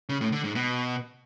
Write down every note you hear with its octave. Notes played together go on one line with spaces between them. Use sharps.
C#3
A2
D3
G#2
B2